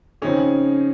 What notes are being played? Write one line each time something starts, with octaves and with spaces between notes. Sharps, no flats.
C#3 F3 C4 C#4 D#4 G#4